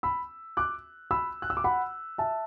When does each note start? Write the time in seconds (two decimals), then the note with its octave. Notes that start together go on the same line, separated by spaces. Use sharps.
0.03 B5 E6
0.57 D6 F#6
1.11 B5 E6
1.42 F#6
1.50 E6
1.57 D6
1.64 F#5 B5
2.18 E5 A5